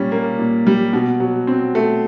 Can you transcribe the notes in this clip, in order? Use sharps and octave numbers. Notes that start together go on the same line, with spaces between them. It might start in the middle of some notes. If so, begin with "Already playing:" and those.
Already playing: A#2 G3 C#4
A#3
A#2
G3
B2
F#3
C4
A3